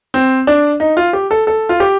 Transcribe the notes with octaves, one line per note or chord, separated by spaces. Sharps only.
C4
D4
D#4
F4
G4
A4
A4
F4
G4